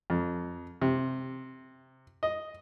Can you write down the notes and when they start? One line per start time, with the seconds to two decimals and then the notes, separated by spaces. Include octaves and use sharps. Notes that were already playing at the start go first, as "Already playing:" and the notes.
0.10 F2
0.82 C3
2.23 D#5